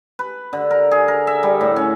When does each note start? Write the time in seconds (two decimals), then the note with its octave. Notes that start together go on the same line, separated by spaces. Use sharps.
0.19 B4
0.53 D3
0.71 A#4
0.91 G#4
1.08 A#4
1.27 E5
1.43 G3
1.61 A2
1.76 C#4